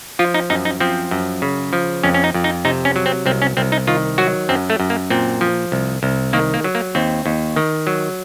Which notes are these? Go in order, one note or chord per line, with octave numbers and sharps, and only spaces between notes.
F3 F4
D#4
F#2 D#4
D#4
F3 C4
F#2
C#3
F3
F2 C#4
C#4
D#4
F2
D#4
C3 D#4
C#4
F#3
C4
C2 C4
C#4
C2 C4
D#4
D#3 F4
F#3 F#4
F#2 C4
A3
F#2
A#3
A#2 C4
F3
C2
C2
D#3 A#3
A#3
F#3
A#3
D#2 C4
D#2
D#3
F#3